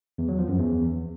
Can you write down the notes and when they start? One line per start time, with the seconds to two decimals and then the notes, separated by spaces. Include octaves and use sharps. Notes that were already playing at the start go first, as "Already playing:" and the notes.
0.18 E2
0.28 F#3
0.39 F3
0.49 F#2
0.59 E2